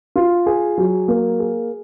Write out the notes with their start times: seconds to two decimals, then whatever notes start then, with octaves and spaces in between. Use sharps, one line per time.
0.16 F4
0.46 G#4
0.78 F#3
1.08 A#3
1.40 G#4